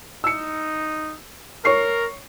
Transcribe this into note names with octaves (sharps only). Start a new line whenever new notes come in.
D#4 E6 C#7
A#4 C#5 C#6 C7